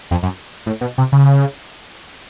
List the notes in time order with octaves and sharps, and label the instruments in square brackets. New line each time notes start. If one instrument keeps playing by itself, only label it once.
[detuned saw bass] F2
F#2
A2
B2
C3
C#3